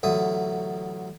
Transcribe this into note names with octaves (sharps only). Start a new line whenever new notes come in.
A1 D3 F#3 E5 D#6